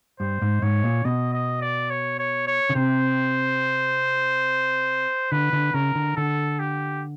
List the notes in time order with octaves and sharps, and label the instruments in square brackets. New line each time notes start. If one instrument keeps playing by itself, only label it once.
[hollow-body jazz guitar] G2 [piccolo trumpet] C5
[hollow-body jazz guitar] G#2
[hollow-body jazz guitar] G#2 [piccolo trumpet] C#5
[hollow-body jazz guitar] A#2
[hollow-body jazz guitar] B2 [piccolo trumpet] D#5
[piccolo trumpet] D#5
D5
C#5
C#5
C#5
[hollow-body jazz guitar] C#3
[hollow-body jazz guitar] C3 [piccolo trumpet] C5
[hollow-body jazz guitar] D3 [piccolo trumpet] B4
[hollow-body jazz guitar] D3
[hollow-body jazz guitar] C#3 [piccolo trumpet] A#4
[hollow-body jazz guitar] D3
[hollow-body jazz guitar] D3 [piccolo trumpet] A4
[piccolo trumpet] G4